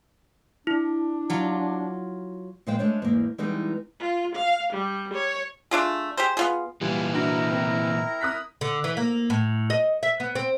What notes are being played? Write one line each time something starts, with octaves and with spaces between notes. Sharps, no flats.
D4 E4
F#3 F4 F5
A#2 F3 G#3 C5 F5 G5
G#3 A3 D4 C5 C#5
E2 G#2 A#3
E3 G3 G#3 B3 C4 D#4
F4
F5
G3
C#5
A3 D4 F4 G#4
G4 G#4 C5
B3 F4 G#4
A#2 E3 G3 B3 F4 G#5
D4 E4 F#4 A#4 A#5
C4
D#6 F#6 B6
D3
E3
A#3
A2
D#5
E5
B3
C4